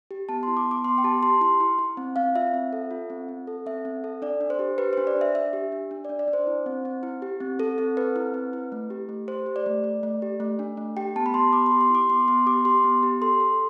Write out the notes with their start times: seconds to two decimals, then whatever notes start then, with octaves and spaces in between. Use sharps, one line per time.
0.11 G4
0.29 B3 A5
0.43 C6
0.48 E4
0.57 D6
0.66 B3
0.71 D6
0.84 B3 C6
0.98 G5
1.04 G4 A5
1.23 G4 C6
1.41 E4 C6
1.60 E4
1.79 E4
1.97 C4
2.16 C4 F5
2.35 F4 E5
2.54 C4
2.73 A4
2.91 F4
3.10 C4
3.29 C4
3.47 A4
3.66 C4 E5
3.85 C4
4.04 A4
4.22 D4 D5
4.41 D4
4.50 C5
4.59 G4
4.78 G4 B4
4.93 D4 C5
5.07 D5
5.16 D4
5.21 E5
5.35 D4 E5
5.53 G4
5.72 D4
5.91 D4
6.05 D4 D5
6.19 D5
6.28 D4
6.33 C5
6.47 E4
6.66 C4
6.85 C4
7.03 E4
7.22 G4
7.40 C4
7.59 C4 A4
7.78 C4 A4
7.97 C4 B4
8.16 E4
8.34 C4
8.53 E4
8.72 A3
8.90 G4
9.09 A3
9.28 G4 C5
9.46 G4
9.56 D5
9.66 A3
9.84 A3
10.03 A3
10.22 G4
10.40 A3
10.59 D4
10.77 A3
10.97 G4 G5
11.16 B3 A5
11.26 B5
11.34 G4 C6
11.53 B3 D6
11.66 C6
11.71 G4
11.81 C6
11.90 E4 D6
12.09 B3 C6
12.28 B3 C6
12.46 G4 D6
12.65 G4 C6
12.84 B3
13.03 G4
13.22 A4 C6
13.41 A4